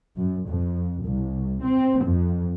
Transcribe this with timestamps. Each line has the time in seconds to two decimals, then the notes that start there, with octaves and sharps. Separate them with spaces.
0.17 F#2
0.48 F2
1.03 C2
1.63 C4
2.03 F2